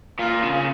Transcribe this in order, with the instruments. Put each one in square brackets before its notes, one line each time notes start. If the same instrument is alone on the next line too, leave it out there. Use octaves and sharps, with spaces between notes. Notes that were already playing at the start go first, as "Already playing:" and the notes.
[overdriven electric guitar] A#2 [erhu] F4
[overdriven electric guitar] C#3